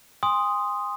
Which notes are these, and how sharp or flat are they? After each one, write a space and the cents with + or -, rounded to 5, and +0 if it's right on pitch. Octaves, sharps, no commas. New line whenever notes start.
G#5 -40 C6 +0 D#6 +0